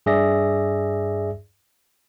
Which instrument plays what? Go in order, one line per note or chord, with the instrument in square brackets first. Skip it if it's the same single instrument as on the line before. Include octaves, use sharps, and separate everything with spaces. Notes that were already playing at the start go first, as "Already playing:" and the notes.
[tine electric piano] G2 G#4 D5 E5 A#6